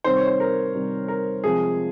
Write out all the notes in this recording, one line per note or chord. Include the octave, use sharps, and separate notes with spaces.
C3 D#3 G3 C5
C#5
C5
A#4
C3 D#3 G3
A#4
C3 F3 G#3 G#4